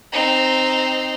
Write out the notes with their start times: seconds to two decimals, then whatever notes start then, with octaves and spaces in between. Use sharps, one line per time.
0.12 C4 D#4